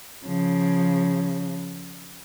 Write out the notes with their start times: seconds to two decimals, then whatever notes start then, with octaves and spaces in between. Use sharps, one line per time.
0.25 C#3 F3